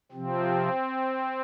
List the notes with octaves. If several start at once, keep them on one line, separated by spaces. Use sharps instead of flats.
C3 F3 C4